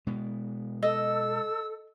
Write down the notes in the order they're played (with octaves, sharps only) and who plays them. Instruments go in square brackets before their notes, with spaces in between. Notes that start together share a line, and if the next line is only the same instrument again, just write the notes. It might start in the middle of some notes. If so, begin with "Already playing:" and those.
[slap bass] B2 G#3 B3
[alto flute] A4 [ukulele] D#5 [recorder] E6